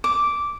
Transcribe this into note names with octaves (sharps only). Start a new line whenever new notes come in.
D6